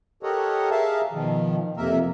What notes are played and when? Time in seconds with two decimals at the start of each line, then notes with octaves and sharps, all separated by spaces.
0.23 G4 A4 A#4 C#5 D#5 F#5
0.71 G#4 A#4 E5 F5 A5
1.12 B2 D#3 F3
1.77 F2 C3 A#3 A#4 E5